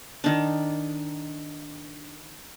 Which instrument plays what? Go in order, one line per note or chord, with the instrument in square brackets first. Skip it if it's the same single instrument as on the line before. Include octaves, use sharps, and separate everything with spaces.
[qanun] D#3 D4